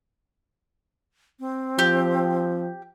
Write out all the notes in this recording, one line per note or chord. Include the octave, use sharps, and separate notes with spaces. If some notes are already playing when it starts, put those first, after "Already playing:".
C4
F3 G4